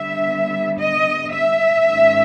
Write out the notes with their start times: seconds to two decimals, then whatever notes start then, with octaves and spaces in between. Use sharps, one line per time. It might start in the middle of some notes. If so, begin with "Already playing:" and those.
Already playing: D3 G3 B3 E5
0.78 D#5
1.31 E5
1.85 G#2 D#3 G#3 C#4